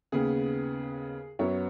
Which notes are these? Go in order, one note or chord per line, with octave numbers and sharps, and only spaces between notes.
D#2 C#3 B3 G#4
F#2 F#3 B3 C#5